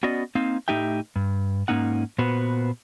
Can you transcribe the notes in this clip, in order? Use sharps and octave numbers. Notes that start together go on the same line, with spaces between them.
B3 C#4 F#4 D5 D#5
A#3 C4 D#4 F5
A2 A3 D#4 G4 E5 G5
G2
G#2 A#3 C#4 D#4 F#5
A#2 B3 F#4 B4 C5